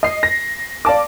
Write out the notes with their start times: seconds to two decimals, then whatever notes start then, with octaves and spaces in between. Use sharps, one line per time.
0.03 D#5 C7
0.23 A#6
0.85 D5 F5 A5 D6